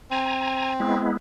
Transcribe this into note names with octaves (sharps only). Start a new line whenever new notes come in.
C4 G#5 A#5
G#3 B3 E4